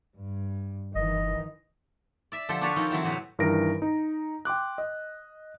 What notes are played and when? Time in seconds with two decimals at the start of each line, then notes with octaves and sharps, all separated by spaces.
0.16 G2
0.95 F#1 D#3 E3 D#5
2.32 D5 E5
2.49 D3 F3 G4 A4 C5
2.61 D4 G4 A4 B4 C#5
2.76 D#3 F3 C4 C#4 D#4
2.91 D3 E3 F#3 C4
3.04 A2 C3 F#3 B4
3.39 G2 D#3 E3 A#4 A#6 D7
3.82 D#4
4.45 G5 C6 D6 F#6
4.78 D#5